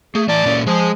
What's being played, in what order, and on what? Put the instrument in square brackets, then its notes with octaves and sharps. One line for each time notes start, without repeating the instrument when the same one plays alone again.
[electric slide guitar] A3 [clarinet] G#4
[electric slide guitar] A2 E3 A5 [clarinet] D5
[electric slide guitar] A#2 A#3 C#4
[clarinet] F3 [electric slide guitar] G#3 G#4